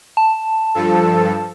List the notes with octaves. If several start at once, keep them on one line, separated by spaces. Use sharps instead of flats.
A5
G2 F3 A4